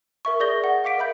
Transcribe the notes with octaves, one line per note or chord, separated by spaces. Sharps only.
A#4 E5 C#6
G#4 D5 G6 A#6 G7
F#5
F5 F#5 D6 B6 D7
A#4 D#5 E5 B5 G6